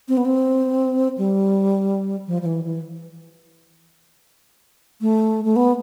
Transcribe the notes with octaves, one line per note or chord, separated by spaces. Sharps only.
C4
B3
C4
G3
F3
F3
E3
E3
A3
A3
B3